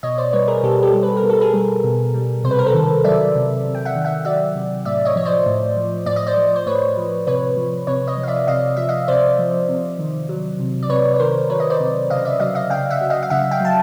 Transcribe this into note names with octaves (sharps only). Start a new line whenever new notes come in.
B2 C#5 D#5
C5 D5
G3 B4 C#5
G#4 A#4
B2 G4 A4
G4 A4
G3
B4
A#4
B2
A4
G#4 A#4
G3
B2
G3
C3 C5
B4
A#4
A4 B4
D#3
F#3 D5 E5
C3
C3
G5
E5 F#5
D#3
E5 F#5
F#3 D5 E5
C3
A2 D5 E5
C#5 D#5
F3 C#5
C5 D5
A2
F3
A2 D5
D#5
C5 D5
F3
C5
A2 B4 C#5
F3
C3 B4 C#5
F3
C3 B4 C#5
C#5 D#5
F3
F5
D5 E5
C3 D#5 F5
F3 E5
D#5 F5
C3 C5 D5
F3
C3
D#3
F#3
C3
D5
C3 B4 C#5
C#5
D#3 A#4 C5
F#3 B4 C#5
D#5
C5 D5
C3
C#3 D#5 F5
D5 E5
F#3 D#5 F5
D#5 F5
C#3 F5 G5
E5 F#5
F#3
D#5 F5
F5
C#3 E5 F#5
F5 G5
F#3 A5